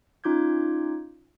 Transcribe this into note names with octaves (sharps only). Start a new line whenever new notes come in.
C#4 D#4 F4 D6 G6 G#6